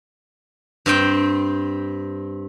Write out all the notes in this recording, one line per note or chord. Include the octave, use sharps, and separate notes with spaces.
G2 C4 G5